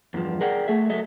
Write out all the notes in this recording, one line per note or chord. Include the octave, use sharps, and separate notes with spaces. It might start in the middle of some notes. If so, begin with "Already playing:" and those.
E2 G2 F3
G#4 A#4 D5 F#5 G5
A3 G#4 E5
F#3 A4 D#5 E5